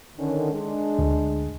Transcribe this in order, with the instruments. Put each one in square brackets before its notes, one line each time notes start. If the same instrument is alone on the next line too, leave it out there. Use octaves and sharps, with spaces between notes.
[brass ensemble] D3 D#3 C#4
G#3 D4
[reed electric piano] D2